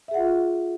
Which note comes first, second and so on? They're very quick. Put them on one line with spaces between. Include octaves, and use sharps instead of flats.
E5 G#4 F#5 F4